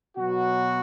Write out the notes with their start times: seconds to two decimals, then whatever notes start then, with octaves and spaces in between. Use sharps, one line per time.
0.18 B2 F#3 F#4